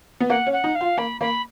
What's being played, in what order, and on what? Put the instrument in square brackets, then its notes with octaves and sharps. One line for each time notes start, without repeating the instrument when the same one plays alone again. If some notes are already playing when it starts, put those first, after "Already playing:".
[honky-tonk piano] B3
[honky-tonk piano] A#3 [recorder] F#5
[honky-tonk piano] C#4
[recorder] F#5
[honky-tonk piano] D#4
[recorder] F5
[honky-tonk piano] F4
[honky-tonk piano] A#3 [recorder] B5
[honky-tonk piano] A#3 [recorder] B5